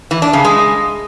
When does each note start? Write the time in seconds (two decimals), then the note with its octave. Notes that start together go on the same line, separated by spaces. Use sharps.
0.11 E3
0.22 D4
0.33 C#3
0.45 G#3